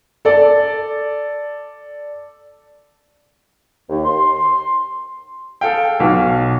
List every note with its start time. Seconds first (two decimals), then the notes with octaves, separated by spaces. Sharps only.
0.25 A4 D5
3.89 D#2
4.05 C6
5.61 G#4 A4 F5 G5
6.00 B1 B2 F5